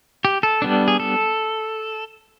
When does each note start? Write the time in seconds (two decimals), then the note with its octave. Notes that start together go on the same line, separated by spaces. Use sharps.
0.25 G4
0.43 A4
0.62 G3 B3 D4
0.88 G#4
1.00 A4